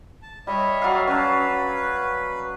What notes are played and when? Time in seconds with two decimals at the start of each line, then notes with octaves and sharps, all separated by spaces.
0.22 A5
0.47 G3 C#5 D#5 E5
0.82 F#3 D5 F5
1.07 C#4 B4 A5